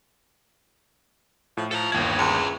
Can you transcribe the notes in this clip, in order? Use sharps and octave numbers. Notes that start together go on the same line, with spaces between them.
A2 F3
F3 A4 A#5
G1 D#2 E4 G5 G#6
C#2